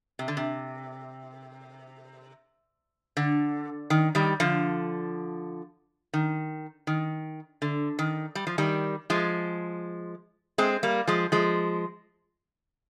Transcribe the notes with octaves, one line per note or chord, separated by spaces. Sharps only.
C3
D3
C3
D3
D#3
D#3 G3
D3 F3
D#3
D#3
D3
D#3
G3
F3
D#3 G3
F3 G#3
G#3 C4
G3 A#3
F3 G#3
F3 G#3